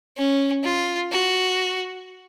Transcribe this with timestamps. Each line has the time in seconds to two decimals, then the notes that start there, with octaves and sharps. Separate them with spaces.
0.18 C#4
0.64 F4
1.12 F#4